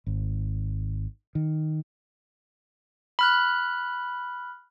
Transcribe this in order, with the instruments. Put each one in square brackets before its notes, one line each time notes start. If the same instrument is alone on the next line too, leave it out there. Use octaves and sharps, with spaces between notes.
[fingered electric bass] G#1
D#3
[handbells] B5 F6 F#6